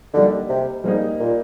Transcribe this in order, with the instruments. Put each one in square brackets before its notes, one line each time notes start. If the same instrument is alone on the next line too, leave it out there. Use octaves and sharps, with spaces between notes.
[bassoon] D3 [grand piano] G3 A#3 D#4
[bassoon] C3
[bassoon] G#2 [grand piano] G3 A#3 D#4
[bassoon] A#2